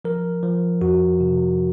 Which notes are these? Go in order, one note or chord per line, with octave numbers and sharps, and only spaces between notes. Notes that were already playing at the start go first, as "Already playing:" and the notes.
F3 A#4
F3
F2 F#4
C3